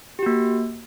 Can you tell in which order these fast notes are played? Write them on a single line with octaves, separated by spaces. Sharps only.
G4 F#4 A#3